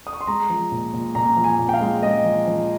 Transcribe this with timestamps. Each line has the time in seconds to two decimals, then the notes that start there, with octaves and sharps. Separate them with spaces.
0.07 D#6
0.13 C#6
0.21 C6
0.27 G#3 A#5
0.50 F3
0.72 A#2
0.93 A#2
1.15 A#2 A#5
1.37 F3
1.44 G#5
1.59 A#2
1.69 G5
1.74 F5
1.81 G#3
2.03 G#3 D#5
2.25 F3
2.47 F3